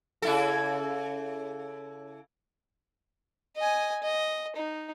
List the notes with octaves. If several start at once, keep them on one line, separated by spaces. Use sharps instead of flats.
C#3 E4 A4
D#5 G#5
D#5
D#4